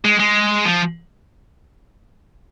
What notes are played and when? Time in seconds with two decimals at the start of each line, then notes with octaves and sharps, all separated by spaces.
0.05 G#3
0.19 G#3
0.65 F3